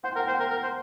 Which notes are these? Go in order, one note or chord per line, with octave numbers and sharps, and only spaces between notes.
C5 F#5
G5
A#4
F#5
C5 G5
F#5
A#4
A#4
C5